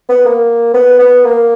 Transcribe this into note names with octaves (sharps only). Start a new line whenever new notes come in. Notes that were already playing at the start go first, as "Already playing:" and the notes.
B3
A#3
B3
B3
A#3